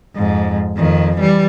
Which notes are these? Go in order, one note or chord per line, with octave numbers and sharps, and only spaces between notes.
F2 G#2
F2 D#3
E3 G3